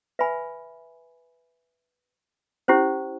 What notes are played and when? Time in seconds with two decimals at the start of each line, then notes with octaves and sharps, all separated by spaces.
0.19 B4 E5 G#5 B5
2.68 C#4 E4 G4 C5